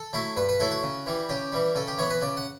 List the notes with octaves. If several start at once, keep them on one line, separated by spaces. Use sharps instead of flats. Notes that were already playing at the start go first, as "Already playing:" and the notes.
Already playing: A4
F#3 A3 E4
G2 B4
B4
F#3 A3 E4 A4
F#4
C#3
E3 G3
C#3 G4
E3 G3
C#3 A4
G4
E3 B3 C#5
B4
C#3 D5
F#5